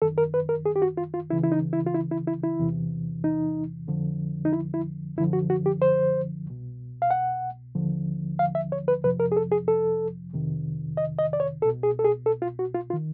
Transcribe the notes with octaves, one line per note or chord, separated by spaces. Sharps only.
F#2 D#3 A4
A#4
B4
A#4
G#4
G4
F#4
F4
F4
C#2 C#3 E3 E4
E4
D#4
E4
F4
E4
E4
E4
E4
E2 C3 E3
D#4
F2 D3 F3
D#4
E4
E4
F#2 D3 F3 E4
F#4
F#4
G4
C5
C2 B2
F5
F#5
D#2 D3 F3
F5
E5
C#5
B4
F2 C3 F3 B4
A#4
G#4
A4
G#4
A4
F2 C3 D#3
D#5
D#5
D5
C#5
C2 B2 A4
G#4
A4
G#4
A4
F4
F#4
F4
F4
D#3